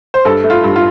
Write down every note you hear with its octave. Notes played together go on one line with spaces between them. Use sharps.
C5
G2 A4
A3
F4
G2
F4